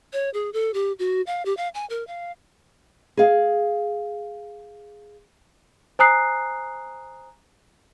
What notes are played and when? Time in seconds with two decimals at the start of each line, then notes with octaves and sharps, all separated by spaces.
0.13 C#5
0.34 G#4
0.53 A4
0.74 G4
0.99 F#4
1.27 F5
1.45 G4
1.57 F5
1.74 G#5
1.90 A#4
2.07 F5
3.17 G#4 F5
5.99 C5 G#5 A#5 D#6 F#6 C7